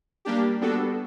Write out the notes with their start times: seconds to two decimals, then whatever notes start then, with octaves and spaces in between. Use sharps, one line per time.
0.25 G3 A#3 D4 G4
0.61 G3 B3 D4 F#4 A4